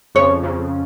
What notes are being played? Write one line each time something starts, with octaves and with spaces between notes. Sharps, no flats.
F2 C#3 F3 C#5
F2 C#3 F3